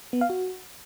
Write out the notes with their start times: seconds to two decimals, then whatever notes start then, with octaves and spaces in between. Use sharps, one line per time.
0.13 B3
0.21 F5
0.30 F#4